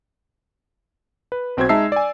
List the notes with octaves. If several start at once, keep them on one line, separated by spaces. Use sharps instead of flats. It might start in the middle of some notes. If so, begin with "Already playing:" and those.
B4
B1 C4 F#4 C5 G#6
G#3 D#4 E5 A5 E6 C7
D5 G#5